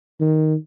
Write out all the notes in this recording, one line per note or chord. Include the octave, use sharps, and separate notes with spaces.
D#3